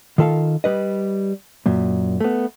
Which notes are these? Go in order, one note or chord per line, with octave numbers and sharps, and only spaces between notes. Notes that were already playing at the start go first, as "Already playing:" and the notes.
D#3 F4 A4 E5 F5
G3 B4 D#5
F#2 A#2
A3 B3